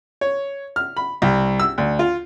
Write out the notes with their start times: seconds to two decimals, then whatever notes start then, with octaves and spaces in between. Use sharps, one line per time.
0.21 C#5
0.76 F6
0.97 B5
1.22 C2
1.60 E6
1.78 D2
1.99 F4